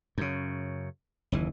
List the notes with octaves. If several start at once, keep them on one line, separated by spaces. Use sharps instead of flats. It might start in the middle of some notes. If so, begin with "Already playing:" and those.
F#2 C#3
F#1 D#2 E3